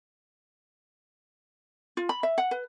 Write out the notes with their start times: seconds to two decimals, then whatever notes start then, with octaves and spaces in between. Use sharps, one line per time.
1.97 F4
2.09 B5
2.23 E5
2.38 F#5
2.51 B4